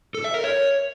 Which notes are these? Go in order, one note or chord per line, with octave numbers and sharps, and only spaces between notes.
A4
E5
A#4
C#5